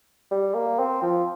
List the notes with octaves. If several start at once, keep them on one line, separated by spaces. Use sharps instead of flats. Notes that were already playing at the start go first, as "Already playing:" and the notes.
G3
A#3
C4
F3